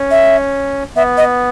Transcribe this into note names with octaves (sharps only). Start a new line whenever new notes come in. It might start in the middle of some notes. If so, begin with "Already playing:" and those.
Already playing: C#4
E5
B3 E5
D#5